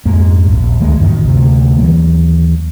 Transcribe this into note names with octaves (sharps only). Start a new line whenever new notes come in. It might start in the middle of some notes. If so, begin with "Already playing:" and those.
F2 G#2 G#3 A#3
D#1 A#1
D2 D#3 G#3 A#3
A1 F#2 C3 D#3
D2 C3
D#2 E3 F#3 A#3